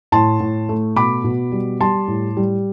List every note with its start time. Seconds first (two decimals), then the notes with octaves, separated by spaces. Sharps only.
0.12 A2 A5 C6
0.40 A2
0.69 A3
0.96 B2 B5 D6
1.24 B2
1.52 G3
1.80 G3 A5 C6
2.08 A2
2.37 G3